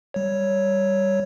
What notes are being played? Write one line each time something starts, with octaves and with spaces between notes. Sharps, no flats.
G3 C#5